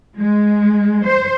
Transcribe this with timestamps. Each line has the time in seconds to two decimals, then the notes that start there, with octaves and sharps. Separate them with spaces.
0.17 G#3
1.05 C5